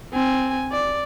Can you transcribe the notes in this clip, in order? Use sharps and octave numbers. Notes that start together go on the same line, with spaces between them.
C4 G#5
D5